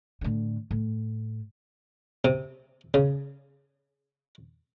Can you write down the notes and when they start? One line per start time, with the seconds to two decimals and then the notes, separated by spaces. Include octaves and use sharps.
0.21 A2 D3
0.71 A2
2.25 C3
2.94 C#3